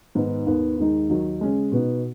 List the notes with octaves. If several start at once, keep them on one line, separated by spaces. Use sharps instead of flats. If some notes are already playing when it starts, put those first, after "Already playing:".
G#2 D#3 B3 D#4
D#2 D#3 B3
D#2 D#3 G#3 D#4
D#2 D#3 F#3 D#4
C#3 G#3 C#4
B2 B3 D#4